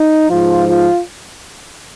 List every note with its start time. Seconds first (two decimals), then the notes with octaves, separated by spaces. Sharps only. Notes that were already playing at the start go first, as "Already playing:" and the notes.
Already playing: D#4
0.29 G#2 F3 F4
0.66 F4